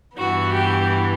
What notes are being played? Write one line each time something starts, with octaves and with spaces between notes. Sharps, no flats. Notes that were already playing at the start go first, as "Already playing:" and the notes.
G2 E3 B3 F#4
G4